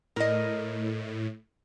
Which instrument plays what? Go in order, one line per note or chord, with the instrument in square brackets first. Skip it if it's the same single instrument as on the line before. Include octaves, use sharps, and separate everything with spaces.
[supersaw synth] A2 [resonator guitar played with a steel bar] A#4 D#5